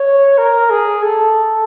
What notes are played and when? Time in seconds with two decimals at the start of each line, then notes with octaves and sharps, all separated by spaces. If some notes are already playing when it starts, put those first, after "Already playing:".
Already playing: C#5
0.38 A#4
0.70 G#4
1.03 A4